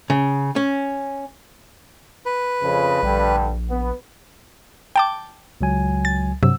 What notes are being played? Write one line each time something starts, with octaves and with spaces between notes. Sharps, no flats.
C#3
C#4
B4
F2 C#3
A#1 G2 D3 G3
B3
G5 A5 D6
C#2 F#3 G#5
A6
G2 C3 F#3 E6